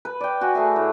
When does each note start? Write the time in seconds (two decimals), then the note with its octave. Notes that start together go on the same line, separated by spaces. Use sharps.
0.05 B4
0.21 D5 G5
0.41 F#4 F#5 G#5
0.55 A3 G#4 E5
0.76 A2